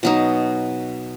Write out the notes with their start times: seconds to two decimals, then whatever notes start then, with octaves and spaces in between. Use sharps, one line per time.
0.03 B2 F#3 D#4